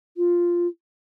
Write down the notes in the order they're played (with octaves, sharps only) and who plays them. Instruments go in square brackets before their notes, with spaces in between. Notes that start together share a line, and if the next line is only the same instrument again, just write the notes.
[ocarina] F4